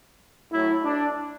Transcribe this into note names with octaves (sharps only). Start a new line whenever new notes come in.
A2 F#3 A3 E4
D4